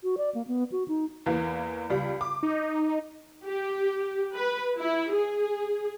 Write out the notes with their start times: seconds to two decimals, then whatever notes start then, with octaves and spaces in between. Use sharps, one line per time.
0.04 F#4
0.18 D5
0.35 A#3
0.47 B3
0.72 F#4
0.88 D#4
1.26 E2 E3 A#3
1.90 C#2 G3
2.21 D6
2.43 D#4
3.43 G4
4.36 B4
4.77 E4
5.12 G#4